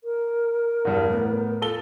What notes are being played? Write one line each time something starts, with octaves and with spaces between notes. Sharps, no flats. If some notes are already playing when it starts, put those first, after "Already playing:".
A#4
E2 G2
A2 B3
F4 A4 G7